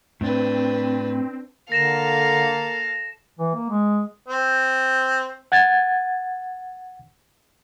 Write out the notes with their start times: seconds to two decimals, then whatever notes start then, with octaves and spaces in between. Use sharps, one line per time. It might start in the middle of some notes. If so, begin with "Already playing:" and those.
0.21 A2 C4 D4 B4
1.72 D3 A#3 A4 F5 A#6 E7
3.39 E3
3.55 A#3
3.70 G#3
4.28 C4
5.52 F#5 G#6 A6